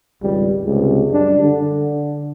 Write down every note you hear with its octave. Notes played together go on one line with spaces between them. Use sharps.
G#1 C#2 G3
C#2 C3 G#3
F#2 G3 D4
D3